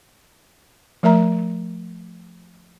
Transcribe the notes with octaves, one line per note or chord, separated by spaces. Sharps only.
F3 A3 A#4 E5 A#5